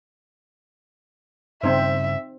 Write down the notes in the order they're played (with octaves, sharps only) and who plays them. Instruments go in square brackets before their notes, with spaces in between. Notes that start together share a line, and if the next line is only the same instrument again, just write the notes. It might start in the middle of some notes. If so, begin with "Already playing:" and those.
[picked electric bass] G2 C#3 [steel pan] C4 D#4 C5 [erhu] E5